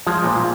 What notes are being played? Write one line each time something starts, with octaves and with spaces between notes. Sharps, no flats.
F3 G#3
A#2